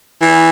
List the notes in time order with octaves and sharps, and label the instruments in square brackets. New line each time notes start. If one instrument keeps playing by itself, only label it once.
[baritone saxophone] E3